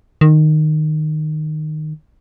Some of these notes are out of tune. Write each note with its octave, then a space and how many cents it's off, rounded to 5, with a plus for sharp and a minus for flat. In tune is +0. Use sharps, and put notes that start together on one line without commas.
D#3 -15